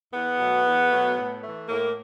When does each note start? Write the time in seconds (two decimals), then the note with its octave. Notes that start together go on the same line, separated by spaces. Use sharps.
0.13 E2 B3
0.39 B2 F#3 A3
0.65 E2
0.91 B2 F#3 A3
1.17 A2
1.43 E3 A3
1.68 A2 A#3